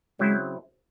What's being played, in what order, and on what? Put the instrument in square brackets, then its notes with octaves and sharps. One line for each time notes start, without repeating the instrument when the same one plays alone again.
[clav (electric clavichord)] C#3 F#3 C4 E4 C5 [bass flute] G#3